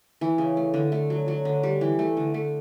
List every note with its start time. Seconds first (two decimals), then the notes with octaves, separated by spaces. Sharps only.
0.21 E3
0.38 C#3
0.57 A3
0.74 D3
0.92 A3
1.10 F#3
1.28 F#3
1.45 D3
1.63 G3
1.81 E3
1.99 A3
2.17 D3
2.34 A3